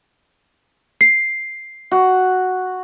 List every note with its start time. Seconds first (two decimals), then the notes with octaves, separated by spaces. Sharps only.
1.01 C7
1.91 F#4